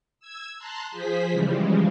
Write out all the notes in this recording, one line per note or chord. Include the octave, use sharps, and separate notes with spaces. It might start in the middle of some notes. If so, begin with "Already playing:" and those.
E6 G#6
A5 A#5 C6 F#6
F3 G#4 C5 B6
C#3 E3 F3 G3 G#3